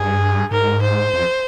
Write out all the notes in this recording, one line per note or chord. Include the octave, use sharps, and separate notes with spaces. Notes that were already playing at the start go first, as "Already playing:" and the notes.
Already playing: G2 G#4
G#2 A#4
C5
F2